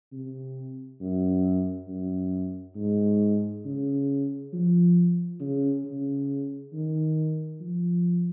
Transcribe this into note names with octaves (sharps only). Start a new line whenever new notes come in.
C3
F#2
F#2
G#2
C#3
F3
C#3
C#3
D#3
F3